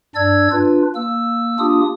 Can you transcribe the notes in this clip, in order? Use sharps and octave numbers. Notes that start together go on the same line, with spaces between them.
G2 D4 D5 E6 G#6
D4 F4 B4
A#3 E6
A#3 D4 F4 G4 D#6